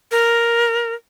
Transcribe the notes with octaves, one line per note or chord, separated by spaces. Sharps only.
A#4